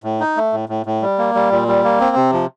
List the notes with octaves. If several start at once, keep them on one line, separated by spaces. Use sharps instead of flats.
A2
D#4
A3
A2
A2
A2
G3
A#3
G3
A#2
G3
A#3
C4
C3
F3